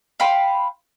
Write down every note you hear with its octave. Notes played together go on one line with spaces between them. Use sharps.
F5 G5 B5 C6